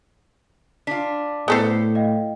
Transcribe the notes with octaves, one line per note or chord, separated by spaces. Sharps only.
D4 F4 B6
A2 B3 A4 C5 G6 B6 C7
D#5 F5 G5